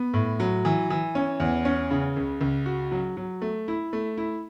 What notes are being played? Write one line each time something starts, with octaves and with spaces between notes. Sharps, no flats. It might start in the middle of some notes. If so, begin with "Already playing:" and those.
Already playing: B3
A2
F#3
E3
E3
C#4
E2
C#4
C#3
C#2
C#2
F#4
F#3
F#3
A3
E4
A3
E4